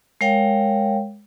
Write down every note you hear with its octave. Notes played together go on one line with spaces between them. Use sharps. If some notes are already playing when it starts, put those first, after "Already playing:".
G#3 A#4 C#5 F5 G5